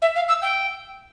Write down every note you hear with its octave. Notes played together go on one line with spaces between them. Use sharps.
E5
F5
E6
G5